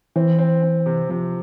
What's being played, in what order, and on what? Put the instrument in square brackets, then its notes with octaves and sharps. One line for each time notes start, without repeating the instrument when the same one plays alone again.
[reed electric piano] E3 [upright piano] C4
[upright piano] C4
C4
C3
[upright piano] C3 [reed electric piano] F3